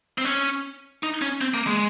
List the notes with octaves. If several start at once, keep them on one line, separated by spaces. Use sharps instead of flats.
C4
C#4
D#4
C#4
C4
A#3
G#3